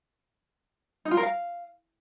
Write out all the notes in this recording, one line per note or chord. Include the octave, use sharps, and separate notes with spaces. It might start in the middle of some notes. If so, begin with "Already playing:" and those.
D#4
F4
A#4
F5